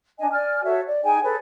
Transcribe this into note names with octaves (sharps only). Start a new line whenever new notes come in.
D4 D#5 G#5
D5 G#5 F6
F#4 A4 C#5 E5
D5
D#4 G#4 G5 G#5
G#4 A4 B4 C#5